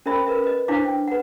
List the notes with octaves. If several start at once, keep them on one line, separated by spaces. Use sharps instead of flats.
C#4 A#4 C5 E5 B5
A#4 B4 E5
B4 D#5
D4 E4 C5 F5 D6
G5
B4 F#5